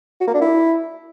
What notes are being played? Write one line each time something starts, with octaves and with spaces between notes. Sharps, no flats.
F#4
A#3
D4
E4